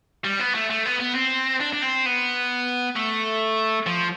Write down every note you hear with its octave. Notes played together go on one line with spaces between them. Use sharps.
G3
B3
A3
A3
B3
B3
C4
D4
D4
C4
B3
A3
F3